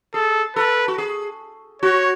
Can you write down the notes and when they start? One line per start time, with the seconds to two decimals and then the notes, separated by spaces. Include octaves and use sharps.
0.14 G#4 A4
0.56 A4 B4
0.88 F#4
0.98 G#4
1.82 F#4 C#5